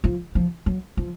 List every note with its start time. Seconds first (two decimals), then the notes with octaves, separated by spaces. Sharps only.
0.04 F3
0.35 F3
0.66 F#3
0.97 F3